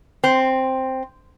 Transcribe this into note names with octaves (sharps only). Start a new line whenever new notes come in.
C4